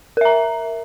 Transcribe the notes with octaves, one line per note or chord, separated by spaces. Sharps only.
A#4 E5 A#5